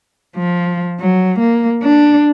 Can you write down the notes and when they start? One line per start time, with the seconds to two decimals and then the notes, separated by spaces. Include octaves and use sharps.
0.36 F3
1.00 F#3
1.39 A#3
1.83 D4